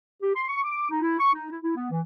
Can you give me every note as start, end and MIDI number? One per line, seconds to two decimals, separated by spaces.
0.22 0.34 67
0.36 0.44 84
0.48 0.61 85
0.64 0.90 86
0.90 1.01 63
1.02 1.16 64
1.20 1.34 85
1.34 1.48 63
1.51 1.58 64
1.63 1.75 64
1.76 1.88 59
1.91 2.01 52